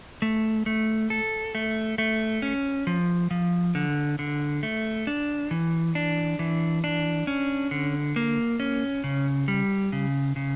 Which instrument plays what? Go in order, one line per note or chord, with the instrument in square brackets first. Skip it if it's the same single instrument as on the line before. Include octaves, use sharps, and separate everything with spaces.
[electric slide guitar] A3
A3
A4
A3
A3
C#4
F3
F3
D3
D3
A3
D4
E3
D4
E3
D4
C#4
D3
A#3
C#4
C#3
G3
C#3
C#3